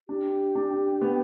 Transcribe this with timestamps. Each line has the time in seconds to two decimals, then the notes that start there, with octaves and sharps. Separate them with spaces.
0.09 D4 G4
0.56 D4
1.02 B3